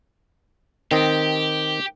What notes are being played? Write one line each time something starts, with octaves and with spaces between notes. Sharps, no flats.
D#3 C4 G4 D#5